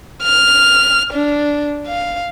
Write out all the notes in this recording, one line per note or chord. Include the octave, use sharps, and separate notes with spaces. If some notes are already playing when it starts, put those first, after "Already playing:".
F6
D4
F5